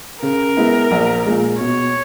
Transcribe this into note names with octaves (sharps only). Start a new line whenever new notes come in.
C#3 A#4
G#3 B3 E4
A#1
A#2 G#3
B2 C#5